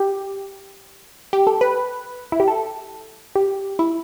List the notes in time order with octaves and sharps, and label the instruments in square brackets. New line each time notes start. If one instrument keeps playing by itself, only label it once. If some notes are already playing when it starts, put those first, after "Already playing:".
Already playing: [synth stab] G4
G4
A4
B4
E4
G4
A4
G4
E4